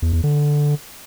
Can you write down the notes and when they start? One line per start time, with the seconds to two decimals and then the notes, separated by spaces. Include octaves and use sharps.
0.02 E2
0.13 E2
0.24 D3